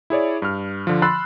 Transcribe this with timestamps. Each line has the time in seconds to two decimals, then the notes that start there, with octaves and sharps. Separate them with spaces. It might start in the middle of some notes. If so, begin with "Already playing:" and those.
0.10 E4 G#4 C#5 D5
0.42 G2 F6
0.87 D3 F3
1.02 B5 C6 E6 F#6 A6 C7